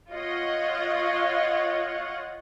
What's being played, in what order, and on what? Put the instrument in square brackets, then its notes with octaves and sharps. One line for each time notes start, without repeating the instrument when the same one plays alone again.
[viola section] F4 C#5 D#5 F#5